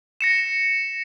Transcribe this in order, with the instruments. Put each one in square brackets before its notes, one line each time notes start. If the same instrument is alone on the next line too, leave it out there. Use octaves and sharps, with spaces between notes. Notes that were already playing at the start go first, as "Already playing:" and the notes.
[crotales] A#6 C#7 E7